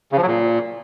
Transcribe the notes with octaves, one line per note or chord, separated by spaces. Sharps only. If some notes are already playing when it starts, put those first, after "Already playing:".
C#3
F3
F#3
A#2